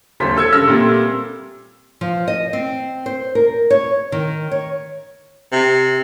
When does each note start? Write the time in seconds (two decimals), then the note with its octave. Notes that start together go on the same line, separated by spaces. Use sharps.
0.20 D#1 G#1 D2 F#3 C5 B6
0.36 A4 E6 G#6 C#7
0.53 G2 C#3 A4 E6 F6 A#6
0.67 A#2 G3 A3 A#3 C4
2.01 F3
2.28 D#5
2.53 C4
3.06 C5
3.35 A#4
3.70 C#5
4.12 D#3
4.51 C#5
5.52 C3